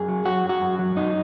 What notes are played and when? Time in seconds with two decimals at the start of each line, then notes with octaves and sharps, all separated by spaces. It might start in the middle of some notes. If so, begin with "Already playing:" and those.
Already playing: F#2 G#4
0.08 F#3
0.25 F#3 F#4
0.44 F#2
0.49 F#4
0.61 F#2
0.79 F#3
0.96 F#2 D#4